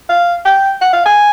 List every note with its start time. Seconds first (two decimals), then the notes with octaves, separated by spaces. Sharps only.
0.09 F5
0.45 G5
0.81 F#5
0.93 F5
1.06 G#5